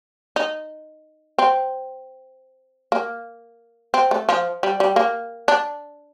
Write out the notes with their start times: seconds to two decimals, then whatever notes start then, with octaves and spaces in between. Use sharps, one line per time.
0.36 D#4
1.38 C4
2.92 A#3
3.94 C4
4.11 A3
4.29 F3
4.63 G3
4.80 G3
4.96 A#3
5.48 D4